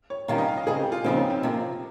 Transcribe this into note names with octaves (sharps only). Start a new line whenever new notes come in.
C#5
C3 D#3 G3 C#4 F4 F5
D#5
F5
D#5
C#3 G#3 C4 G#4
G4
F4
D#2 C#3 F3 C4 D#4
C#4
C4
C3 F3 A#3